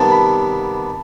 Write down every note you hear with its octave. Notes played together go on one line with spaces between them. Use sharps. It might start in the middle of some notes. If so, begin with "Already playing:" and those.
Already playing: C3 D#3 G3 B3 A5
B5